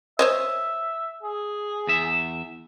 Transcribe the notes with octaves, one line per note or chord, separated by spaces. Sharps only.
C5 C#5 D#5 E5
G#4
E2 E5